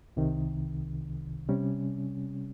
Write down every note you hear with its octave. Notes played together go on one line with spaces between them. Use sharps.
C2 C3 D#3
C3 G3 C#4